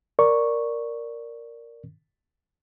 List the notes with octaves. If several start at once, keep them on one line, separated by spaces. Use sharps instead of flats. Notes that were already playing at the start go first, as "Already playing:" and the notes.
A#4 D5 C#6